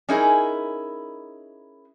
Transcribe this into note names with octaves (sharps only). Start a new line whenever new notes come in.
C#4 D#4 E4 G#4 A#4